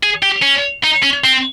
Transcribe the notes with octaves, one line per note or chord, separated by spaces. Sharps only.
G#4
G4
C#4
D#4
C#4
C4